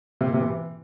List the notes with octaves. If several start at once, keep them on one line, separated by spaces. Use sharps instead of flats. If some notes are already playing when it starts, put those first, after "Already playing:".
C3
A#3
C3
E3